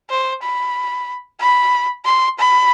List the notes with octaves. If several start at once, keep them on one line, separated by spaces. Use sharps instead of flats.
C5
B5
B5
C6
B5